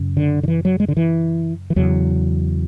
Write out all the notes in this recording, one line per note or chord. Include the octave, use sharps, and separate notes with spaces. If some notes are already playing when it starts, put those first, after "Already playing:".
Already playing: F#2 C#3
D3
D3
E3
F#3
G#3
D3
E3
E3
E2 C#3 F#3